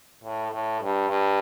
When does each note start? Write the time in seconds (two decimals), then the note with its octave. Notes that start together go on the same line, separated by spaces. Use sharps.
0.24 A2
0.52 A2
0.81 G2
1.08 G2